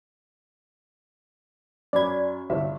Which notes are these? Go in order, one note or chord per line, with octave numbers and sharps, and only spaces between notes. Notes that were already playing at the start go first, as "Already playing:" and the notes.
F#2 C#4 F#4 D5 B5 G#6
G1 C2 G2 E5